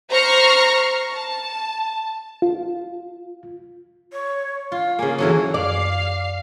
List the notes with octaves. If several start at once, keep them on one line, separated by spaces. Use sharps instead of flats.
C5 A#5 C#6 F6 A#6 C7
A5
F4
C#5
F4 F5
C#3 A#3 G#5
E3 F#3 C#4 A4
F#2 D5 F5 C7